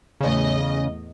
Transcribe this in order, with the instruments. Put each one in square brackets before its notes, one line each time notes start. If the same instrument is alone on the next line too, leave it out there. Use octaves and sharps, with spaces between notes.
[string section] E2 A2 D#5 [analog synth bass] C#3